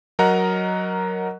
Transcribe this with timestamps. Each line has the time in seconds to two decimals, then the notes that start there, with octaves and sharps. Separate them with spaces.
0.19 F#3 A#4 D#5 F#5 A#5 F#6